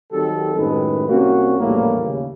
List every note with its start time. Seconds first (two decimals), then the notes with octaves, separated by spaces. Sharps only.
0.12 D#3 F#3 G3 C4 G4 A4
0.55 F#2 A2 D#3 G#3 G4 B4
1.08 C2 A#3 C4 C#4 F#4
1.59 A#1 E2 A2 E3 G3 A#3
2.03 D#2 C#3